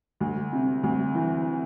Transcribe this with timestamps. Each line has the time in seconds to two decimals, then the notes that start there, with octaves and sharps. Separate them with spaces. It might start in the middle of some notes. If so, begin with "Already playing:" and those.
0.21 D2
0.53 C3
0.83 D2
1.15 E3